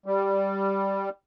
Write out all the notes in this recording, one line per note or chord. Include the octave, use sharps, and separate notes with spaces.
G3